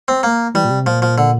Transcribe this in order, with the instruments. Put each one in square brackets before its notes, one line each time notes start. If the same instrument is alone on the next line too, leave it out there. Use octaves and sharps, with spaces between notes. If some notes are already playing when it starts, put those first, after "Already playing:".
[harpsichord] C4
A#3
[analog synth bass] E3 [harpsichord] G3
[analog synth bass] A#2
C3
[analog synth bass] A#2 [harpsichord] F3
[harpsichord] F3
D3